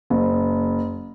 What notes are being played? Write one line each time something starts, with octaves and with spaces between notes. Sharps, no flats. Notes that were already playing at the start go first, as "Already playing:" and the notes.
F#1